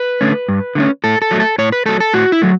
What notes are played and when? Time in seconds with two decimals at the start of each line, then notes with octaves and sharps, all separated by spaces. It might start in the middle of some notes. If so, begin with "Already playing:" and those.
Already playing: B4
0.21 D3 A3 C#4
0.49 G2
0.75 D3 A3 C#4
1.04 A2 A4
1.22 A4
1.31 F#3 A3
1.40 A4
1.58 A2 C#5
1.72 B4
1.86 F#3 A3 A4
2.00 A4
2.13 A2 F#4
2.32 E4
2.42 F#3 A3